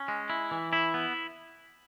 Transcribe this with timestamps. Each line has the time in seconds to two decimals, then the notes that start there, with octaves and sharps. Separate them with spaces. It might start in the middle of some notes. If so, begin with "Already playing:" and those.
Already playing: C#4
0.08 G#3
0.30 E4
0.51 E3
0.73 E4
0.94 B3